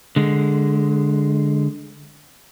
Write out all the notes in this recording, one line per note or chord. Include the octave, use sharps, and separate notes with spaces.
D3 G#3